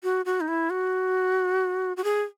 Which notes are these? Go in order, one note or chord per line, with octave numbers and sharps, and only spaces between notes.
F#4
F#4
D#4
E4
F#4
F#4
G#4